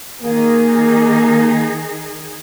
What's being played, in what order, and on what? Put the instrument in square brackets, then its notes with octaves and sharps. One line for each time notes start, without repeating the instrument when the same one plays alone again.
[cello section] D#3 D#4 G#4 [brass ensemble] A#3